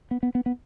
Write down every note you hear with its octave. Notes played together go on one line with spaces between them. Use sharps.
B3
B3
B3
B3